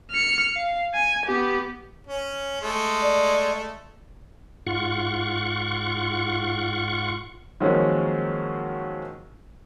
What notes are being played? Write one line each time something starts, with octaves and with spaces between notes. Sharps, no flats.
F6 C#7
F5
G#5
B3 G4
C#4
G#3 A3
D5
G#2 F4 F#5 C#6
D#3 F3 F#3 G#3 A#3 C#4